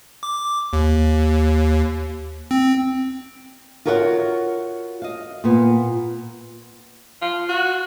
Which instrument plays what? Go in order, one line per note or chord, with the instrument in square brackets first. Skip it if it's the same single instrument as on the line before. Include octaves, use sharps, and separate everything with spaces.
[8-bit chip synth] D6
D#2
C4
[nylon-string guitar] F4 F#4 A#4 C#5 D#5 F#5
D#5 F5
A#2 B3
[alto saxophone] F4
F#4